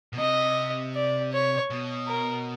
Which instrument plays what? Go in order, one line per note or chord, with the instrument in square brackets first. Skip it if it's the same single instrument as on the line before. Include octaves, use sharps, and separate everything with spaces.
[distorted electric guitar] B2
[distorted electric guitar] C3 [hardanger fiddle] D#5
[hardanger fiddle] D5
C#5
[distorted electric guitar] B2
[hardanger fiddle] A#4